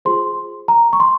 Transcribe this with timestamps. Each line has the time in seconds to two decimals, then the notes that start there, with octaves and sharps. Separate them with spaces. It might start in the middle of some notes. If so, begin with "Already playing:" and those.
0.05 F4 G#4 C5 C6
0.68 A#5
0.93 C#6
1.00 C6